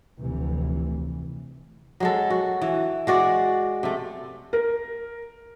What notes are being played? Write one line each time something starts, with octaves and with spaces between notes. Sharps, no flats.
F1 D2 C3 E3
F#3 G#3 A4
F#4
E3
G#3 F#4 D5 F#5
C3 A3
A#4